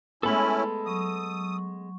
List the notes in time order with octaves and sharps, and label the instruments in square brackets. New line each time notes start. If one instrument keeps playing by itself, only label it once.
[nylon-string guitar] G#3 A3 B3 [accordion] C#4 E4 [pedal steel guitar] A4 B5
[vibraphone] F#3 C#6 [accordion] D#6